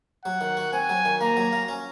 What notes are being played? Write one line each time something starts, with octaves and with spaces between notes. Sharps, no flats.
F#3 F#5
D#3
F#4
C4 G#5
F#3
D#3
A#3 A#5
F#3
F4
C#4